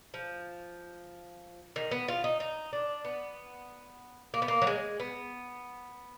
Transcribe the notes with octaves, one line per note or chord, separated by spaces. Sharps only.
F3
D#3
B3
F4
D#4
D#4
D4
B3
A#3
B3
A#3
F#3
G#3
B3